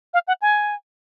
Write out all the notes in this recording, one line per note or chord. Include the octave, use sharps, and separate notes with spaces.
F5
F#5
G#5